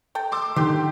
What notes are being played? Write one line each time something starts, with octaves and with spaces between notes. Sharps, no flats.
A4 G5
C6 D6 E6
D3 D#3 G4 C6 G6